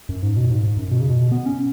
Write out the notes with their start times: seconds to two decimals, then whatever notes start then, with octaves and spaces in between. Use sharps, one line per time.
0.09 F#2
0.23 G#2
0.37 B2
0.50 G#2
0.64 G#2
0.77 F#2
0.91 B2
1.00 C#3
1.10 B2
1.32 B3
1.46 C#4